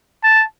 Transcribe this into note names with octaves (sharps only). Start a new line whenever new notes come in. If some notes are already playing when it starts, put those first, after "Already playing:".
A5